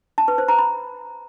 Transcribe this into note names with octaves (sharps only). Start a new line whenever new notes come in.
A5
B4
C5
A#5
B5